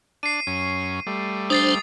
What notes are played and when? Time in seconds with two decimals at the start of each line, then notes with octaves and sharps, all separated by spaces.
0.23 D4 C7 D#7
0.47 F#2 C#4
1.07 G3 A3
1.50 D4 C5 D#6 A6 C7